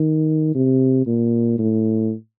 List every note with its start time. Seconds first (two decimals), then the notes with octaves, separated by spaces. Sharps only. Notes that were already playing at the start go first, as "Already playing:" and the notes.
Already playing: D#3
0.55 C3
1.06 A#2
1.58 A2